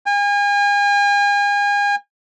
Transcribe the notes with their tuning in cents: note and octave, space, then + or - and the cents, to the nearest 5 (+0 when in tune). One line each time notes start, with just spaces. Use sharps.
G#5 -40